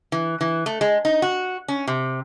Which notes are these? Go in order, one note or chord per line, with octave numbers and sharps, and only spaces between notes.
E3
E3
A3
G#3
D#4
F#4
C#4
C3